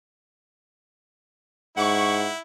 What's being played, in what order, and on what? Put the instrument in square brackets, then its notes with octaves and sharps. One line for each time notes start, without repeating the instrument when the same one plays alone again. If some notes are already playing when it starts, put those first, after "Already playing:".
[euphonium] G#2 [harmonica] E4 [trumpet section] C#5 C#6 [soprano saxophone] F#5